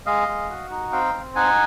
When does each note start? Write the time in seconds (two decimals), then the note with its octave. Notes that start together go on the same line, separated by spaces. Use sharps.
0.06 G#3 D#5 F5
0.28 G#3
0.50 F#4
0.70 D#4
0.92 C4 F5 G5
1.14 C4
1.35 D#4 F#5 G#5